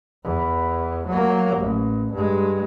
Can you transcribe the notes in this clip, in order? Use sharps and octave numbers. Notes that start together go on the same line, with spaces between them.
E2
F#3 A#3
A1
G2 G#3